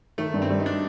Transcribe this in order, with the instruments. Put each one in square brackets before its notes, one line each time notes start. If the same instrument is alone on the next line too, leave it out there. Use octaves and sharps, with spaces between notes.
[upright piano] D#3 [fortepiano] A3
[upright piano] G2
[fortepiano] C4
[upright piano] G3
[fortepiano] D#4
D4